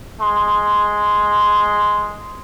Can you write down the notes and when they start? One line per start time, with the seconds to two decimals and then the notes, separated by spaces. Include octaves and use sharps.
0.21 G#3 C6